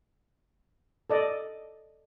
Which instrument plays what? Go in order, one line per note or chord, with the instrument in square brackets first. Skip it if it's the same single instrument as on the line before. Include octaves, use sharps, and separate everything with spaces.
[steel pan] A4 D5 D#5